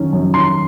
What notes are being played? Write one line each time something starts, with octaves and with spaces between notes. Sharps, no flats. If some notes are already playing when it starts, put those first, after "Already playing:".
Already playing: F#2 D#3 F#3 C#4
F#2
D#3 C6